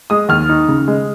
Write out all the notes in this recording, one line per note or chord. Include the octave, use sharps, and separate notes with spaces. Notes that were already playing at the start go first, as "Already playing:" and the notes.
G#3 D#6
D#2 F6
D#4
C#3
G#3